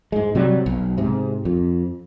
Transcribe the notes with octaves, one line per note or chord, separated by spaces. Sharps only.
G#2 G#3
C3 F#3 G3
B1
G#2 C3
F2